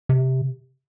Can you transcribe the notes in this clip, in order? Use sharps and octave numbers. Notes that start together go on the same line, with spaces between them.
C3